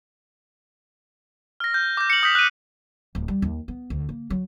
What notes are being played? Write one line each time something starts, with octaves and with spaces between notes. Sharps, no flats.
F6 A#6
G6
D6 G6
C#7 F#7
D#6 G6 B6
F#6 D#7
D1
G3
D#2
B3
D2
A#3
F#3